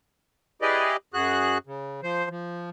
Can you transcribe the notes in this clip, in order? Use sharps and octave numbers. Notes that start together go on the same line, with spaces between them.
E4 G4 G#4 B4 D5 D#5
F#2 F#4 G#4 F#6
C#3
F3 C5
F3